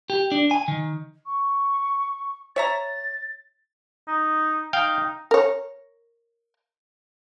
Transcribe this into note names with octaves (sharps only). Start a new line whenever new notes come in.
G4
D4
G#5
D#3
C#6
C#5 E5 A#5 A6
D#4
D#4 F5 G5
A#4 C#5